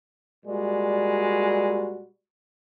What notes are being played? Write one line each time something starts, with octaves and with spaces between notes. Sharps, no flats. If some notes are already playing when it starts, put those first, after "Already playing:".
A#2 G3 G#3 F#4 D5